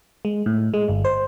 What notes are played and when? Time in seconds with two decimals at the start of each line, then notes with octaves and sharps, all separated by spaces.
0.25 G#3
0.46 A2
0.74 G#3
0.88 G1
1.05 C5